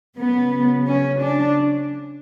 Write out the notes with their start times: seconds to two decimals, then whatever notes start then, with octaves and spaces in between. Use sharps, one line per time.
0.18 C#3 F#3 B3
0.87 C#4
1.21 D4